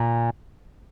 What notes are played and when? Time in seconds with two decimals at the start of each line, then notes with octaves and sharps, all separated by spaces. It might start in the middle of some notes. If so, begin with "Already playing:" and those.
Already playing: A#2